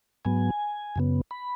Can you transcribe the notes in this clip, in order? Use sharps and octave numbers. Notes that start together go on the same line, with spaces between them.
G#2 F#3 B3 G#5
F#2 C#3 B3
B5